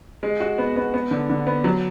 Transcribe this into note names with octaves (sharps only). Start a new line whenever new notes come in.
G#3
F#4
B3
B3
B3
D3
D3
B3
F#3